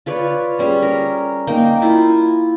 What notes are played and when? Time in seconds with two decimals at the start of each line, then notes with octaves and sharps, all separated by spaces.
0.06 F4 B4 C#5 D5
0.59 G3 C#4 G#4
0.82 A#4
1.47 A#3 D#4 G5
1.82 E4 F4